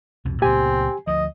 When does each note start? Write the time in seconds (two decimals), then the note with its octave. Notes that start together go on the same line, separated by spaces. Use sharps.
0.25 C2 F2 B2
0.42 C#2 A#2 B3 C4 G4 G#5
1.07 D2 F3 D#5